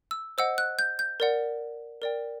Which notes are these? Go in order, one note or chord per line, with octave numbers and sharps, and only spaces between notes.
E6
C5 D#5 F#5 E6
F#6
G6
G6
A#4 D5 F#5
A#4 D5 G5